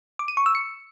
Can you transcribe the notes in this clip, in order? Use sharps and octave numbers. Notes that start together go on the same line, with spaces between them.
D6
D#7
C#6
E6
C#7